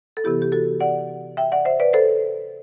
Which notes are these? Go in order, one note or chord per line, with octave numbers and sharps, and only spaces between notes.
A4
C3 E3 B3 E4 G4
G4
F#4 A4
D5 F#5
E5 G5
D5 F#5
C5 E5
B4 D5
A4 C5